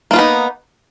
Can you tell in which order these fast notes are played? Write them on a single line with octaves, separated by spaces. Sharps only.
A#3 F4 B3 D#4